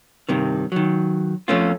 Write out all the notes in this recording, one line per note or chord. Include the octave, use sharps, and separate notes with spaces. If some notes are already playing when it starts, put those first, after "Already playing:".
G2 C3 D#3
D#3 F#3
F2 A3 C#4 F4